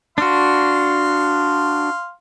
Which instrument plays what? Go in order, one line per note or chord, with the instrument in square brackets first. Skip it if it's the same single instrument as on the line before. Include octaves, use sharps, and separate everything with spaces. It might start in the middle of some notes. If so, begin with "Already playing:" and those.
[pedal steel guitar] D4 F#4 [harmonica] F5 C6